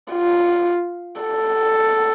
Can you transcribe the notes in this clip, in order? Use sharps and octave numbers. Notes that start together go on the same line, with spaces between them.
F4
A4